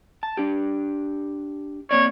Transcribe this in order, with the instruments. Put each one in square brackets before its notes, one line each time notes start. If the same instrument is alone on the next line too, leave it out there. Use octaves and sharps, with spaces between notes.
[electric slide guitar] A5
D4 G4
[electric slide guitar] A#3 C4 D5 [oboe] C#5